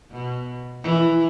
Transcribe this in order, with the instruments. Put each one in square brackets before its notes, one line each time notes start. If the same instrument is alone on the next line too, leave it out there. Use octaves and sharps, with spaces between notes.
[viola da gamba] B2
E3